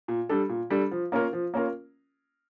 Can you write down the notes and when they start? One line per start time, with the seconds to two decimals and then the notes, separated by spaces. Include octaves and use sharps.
0.08 A#2
0.29 G3 D4 A4
0.49 A#2
0.70 G3 D4 A4
0.91 F3
1.12 A#3 C#4 F4 A#4
1.33 F3
1.54 A#3 C#4 F4 A#4